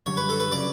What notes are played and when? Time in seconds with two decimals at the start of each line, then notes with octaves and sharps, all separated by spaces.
0.06 F#2 D3 G3 C#5
0.17 B4
0.29 A4
0.40 B4
0.52 C#3 F#3 D5